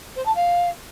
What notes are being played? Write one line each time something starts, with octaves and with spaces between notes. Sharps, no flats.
C5
A5
F5